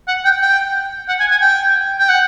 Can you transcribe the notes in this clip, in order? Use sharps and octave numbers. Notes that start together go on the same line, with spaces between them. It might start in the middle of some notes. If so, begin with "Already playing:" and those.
F#5
G5
G5
F#5
G#5
G#5
G5
G5
F#5